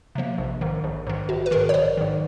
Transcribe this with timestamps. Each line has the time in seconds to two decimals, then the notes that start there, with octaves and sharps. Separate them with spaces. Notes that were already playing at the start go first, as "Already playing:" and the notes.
0.15 C3 F3 A#3
0.38 A#1
0.61 G#2 D#3
0.84 A#1
1.07 G#2 D#3
1.29 A#1 F#4
1.46 B4
1.51 G#2 D#3 G#4 A#4
1.69 C#5
1.74 A#1 C5 D5
1.97 G#2 D#3